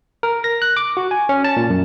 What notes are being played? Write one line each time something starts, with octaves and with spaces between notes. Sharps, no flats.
A#4
A#6
F#6
D6
F#4
G#5
C#4
A5
A#2
F#2